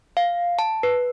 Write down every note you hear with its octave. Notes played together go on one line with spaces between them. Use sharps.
F5
A5
B4